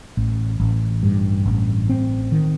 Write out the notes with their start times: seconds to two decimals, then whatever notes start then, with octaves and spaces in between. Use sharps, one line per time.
0.17 A1
0.60 A1
1.03 G2
1.46 A1
1.89 C4
2.32 D#3